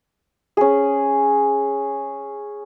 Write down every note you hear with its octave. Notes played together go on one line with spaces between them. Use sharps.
C#4 G#4